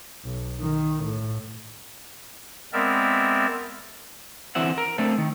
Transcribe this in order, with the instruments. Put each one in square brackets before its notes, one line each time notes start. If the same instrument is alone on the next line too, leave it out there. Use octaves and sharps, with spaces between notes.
[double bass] B1
D#3
A2
[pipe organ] G#3 B3 C4 A#4 D5 E5
[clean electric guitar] D3 E3 C4 E5 F#5
A#4
A3 C4 D4 A4
D#3